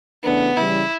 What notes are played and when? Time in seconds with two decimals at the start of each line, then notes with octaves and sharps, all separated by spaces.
0.23 C#3 E3 A3 B3 D4
0.57 C#3 E3 G3 E4